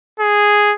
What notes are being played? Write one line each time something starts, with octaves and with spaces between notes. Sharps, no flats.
G#4